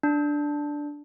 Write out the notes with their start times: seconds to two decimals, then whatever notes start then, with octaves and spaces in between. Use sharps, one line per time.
0.03 D4